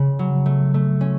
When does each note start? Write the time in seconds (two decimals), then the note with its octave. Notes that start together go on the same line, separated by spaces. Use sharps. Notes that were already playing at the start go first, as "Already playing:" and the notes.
Already playing: C#3 C#4
0.19 F#3
0.46 A3
0.74 A3
1.01 C#4